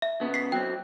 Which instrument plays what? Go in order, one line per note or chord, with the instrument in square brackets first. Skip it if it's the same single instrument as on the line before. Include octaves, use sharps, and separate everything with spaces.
[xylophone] E5
[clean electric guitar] C#3 B3
[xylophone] B6 C7
[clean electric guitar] F#3 C4 [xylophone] G5